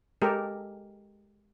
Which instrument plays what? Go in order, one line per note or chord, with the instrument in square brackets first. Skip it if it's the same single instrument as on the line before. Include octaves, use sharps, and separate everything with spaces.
[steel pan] G#3 G4 A4 A#4